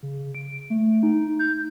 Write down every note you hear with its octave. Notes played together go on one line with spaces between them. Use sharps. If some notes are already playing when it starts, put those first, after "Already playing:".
C#3
D7
A3
D#4
G6